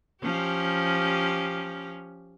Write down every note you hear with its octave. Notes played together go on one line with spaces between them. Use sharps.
F3 C#4 G4